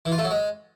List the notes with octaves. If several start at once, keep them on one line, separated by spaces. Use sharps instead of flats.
E3
F4
A3
F#3
G#3